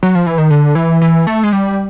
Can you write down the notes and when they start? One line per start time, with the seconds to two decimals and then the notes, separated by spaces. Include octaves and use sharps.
0.03 F#3
0.15 F3
0.26 E3
0.38 D#3
0.50 D3
0.75 E3
1.02 E3
1.27 A3
1.44 G#3
1.52 G3